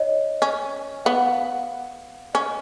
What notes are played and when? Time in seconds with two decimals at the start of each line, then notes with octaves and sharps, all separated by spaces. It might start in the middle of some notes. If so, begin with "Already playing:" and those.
Already playing: D#4 C#5 D#5
0.42 C#4
1.05 B3 F5
1.16 F#5
1.26 F5
2.34 C#4 D#5